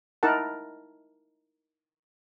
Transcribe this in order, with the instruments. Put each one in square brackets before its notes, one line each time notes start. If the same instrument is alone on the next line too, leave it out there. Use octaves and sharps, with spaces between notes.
[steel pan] D#4 E4 A#4 F#5 A5